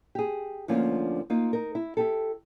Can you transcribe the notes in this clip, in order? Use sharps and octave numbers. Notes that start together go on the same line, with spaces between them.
G4 G#4
D2 D3 F3 A#3 C#4 F4
A#3 D#4 F4
D#4 A#4
E4
E4 G4 A4